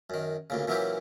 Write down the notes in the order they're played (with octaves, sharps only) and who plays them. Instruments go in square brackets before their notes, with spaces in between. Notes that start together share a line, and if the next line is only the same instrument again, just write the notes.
[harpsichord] F#2 D#3
D2 A#2 C#3
A#2 E3 F#3 C#4 E4 G4